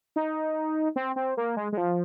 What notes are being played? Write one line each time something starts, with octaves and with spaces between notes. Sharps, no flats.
D#4
C4
C4
A#3
G#3
G#3
F3